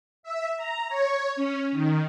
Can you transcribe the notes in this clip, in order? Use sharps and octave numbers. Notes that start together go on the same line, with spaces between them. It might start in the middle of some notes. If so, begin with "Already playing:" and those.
E5
A#5
C#5
C#4
D#3